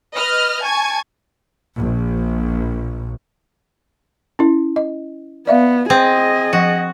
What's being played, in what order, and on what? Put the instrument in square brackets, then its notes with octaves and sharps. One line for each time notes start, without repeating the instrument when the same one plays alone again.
[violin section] B4 D#5 F6
G#5 A5 C#6 G#6
[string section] A#1
[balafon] C#4 E4
D#5
[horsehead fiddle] B3 [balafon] D5 E5 F5
[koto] C4 [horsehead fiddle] G#4 D#5
[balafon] F3 [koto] F#4